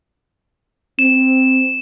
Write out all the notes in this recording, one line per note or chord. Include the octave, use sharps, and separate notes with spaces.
C4 E7